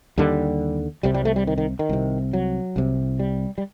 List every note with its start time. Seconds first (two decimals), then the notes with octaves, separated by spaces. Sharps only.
0.18 D#2 D3 G3
1.03 C2 C3 G3
1.14 G3
1.25 A3
1.36 G3
1.47 D#3
1.58 D#3
1.79 D#3
1.89 C2 C3
2.33 F#3
2.76 C2 C3
3.19 G3
3.58 G3